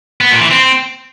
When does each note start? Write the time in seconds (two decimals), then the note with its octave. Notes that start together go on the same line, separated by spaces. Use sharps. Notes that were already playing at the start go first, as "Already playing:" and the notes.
0.21 B3
0.31 A#2
0.41 E3
0.51 C4